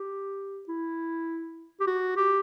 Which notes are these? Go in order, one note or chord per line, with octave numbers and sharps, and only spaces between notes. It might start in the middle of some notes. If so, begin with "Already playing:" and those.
Already playing: G4
E4
G4
F#4
G4